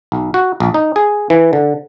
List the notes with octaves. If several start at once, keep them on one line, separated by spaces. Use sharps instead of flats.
B1
F#4
A#1
D#4
G#4
E3
D3